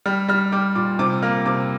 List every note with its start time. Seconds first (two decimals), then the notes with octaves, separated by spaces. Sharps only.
0.06 G3 F6
0.28 G3 F6
0.52 G3 D6
0.75 A#2 D6
0.99 C3 D6
1.22 A#3 F6
1.46 C3 D6